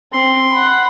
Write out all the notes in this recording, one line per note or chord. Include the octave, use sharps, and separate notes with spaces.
C4 C6
F#5 B5